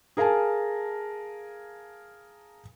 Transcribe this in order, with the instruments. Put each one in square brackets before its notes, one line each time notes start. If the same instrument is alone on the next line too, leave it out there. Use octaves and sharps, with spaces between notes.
[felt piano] G#4 A#4 F5 G#5 A5